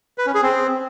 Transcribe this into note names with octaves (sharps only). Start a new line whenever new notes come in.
B4
C#4
G#4
C4